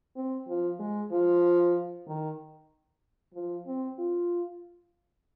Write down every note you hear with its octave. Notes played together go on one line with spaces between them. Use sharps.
C4
F3
G#3
F3
D#3
F3
C4
F4